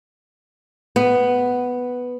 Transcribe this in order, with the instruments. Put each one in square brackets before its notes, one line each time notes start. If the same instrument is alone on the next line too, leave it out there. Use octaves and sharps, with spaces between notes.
[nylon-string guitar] B3